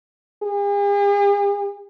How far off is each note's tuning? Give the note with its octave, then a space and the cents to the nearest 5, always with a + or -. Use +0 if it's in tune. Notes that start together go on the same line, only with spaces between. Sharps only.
G#4 -45